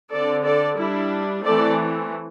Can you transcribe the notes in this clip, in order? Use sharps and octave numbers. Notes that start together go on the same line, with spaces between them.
D3 C4 A4 D5
A4 D5
G3 D4 E4
E3 A3 C4 A4 D5